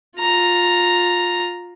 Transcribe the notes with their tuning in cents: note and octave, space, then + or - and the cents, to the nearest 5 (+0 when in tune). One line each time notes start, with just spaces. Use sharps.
F4 +20 A#5 +0